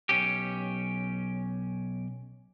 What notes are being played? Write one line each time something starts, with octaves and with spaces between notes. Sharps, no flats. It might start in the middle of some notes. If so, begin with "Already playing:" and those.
B1 C#4 G4